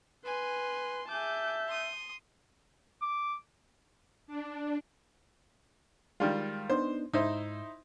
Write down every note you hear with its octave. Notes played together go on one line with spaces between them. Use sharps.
B4 G#5 C6
G#4 E5 A5 D6 G6
C6 D#6
D6
D4
D#3 G3 G#3 F4
B3 D4 D#4 C5
G#2 D#4 E4 C5